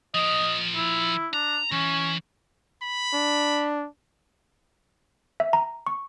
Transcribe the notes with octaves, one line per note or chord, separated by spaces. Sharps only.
F3 A#4 D#5
E4
D4 A#5
E3 C#4
B5
D4
E5
A#5
C#6